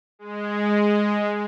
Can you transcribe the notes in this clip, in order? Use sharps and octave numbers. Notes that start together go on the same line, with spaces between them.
G#3